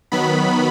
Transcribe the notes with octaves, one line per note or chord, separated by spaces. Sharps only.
D#3 F#3 B3 B5